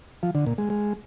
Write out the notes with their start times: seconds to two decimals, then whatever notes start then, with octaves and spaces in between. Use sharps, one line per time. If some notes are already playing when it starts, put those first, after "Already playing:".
0.23 F3
0.35 D3
0.46 A#2
0.58 G#3
0.70 G#3